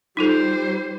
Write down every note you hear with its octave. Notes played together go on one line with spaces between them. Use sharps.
G3 D#4 F4 A4 C5